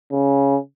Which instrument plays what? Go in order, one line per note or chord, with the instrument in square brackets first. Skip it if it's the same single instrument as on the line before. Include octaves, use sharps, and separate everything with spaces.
[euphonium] C#3